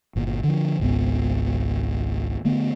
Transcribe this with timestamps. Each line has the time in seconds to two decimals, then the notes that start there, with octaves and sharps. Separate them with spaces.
0.16 G1 A#2
0.44 D3 F3
0.79 G#1 C#2 G#2 B3
2.45 D3 A3 B3